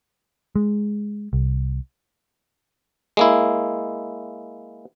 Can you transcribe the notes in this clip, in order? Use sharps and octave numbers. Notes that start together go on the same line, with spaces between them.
G#3
C2
G#3 A#3 E4